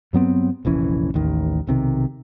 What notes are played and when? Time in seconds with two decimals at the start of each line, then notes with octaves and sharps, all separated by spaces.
0.13 G2 F#3 B3 C4
0.65 F1 A#1 E3 C#4
1.14 A1 D#2 D#3
1.67 B1 C3 D#3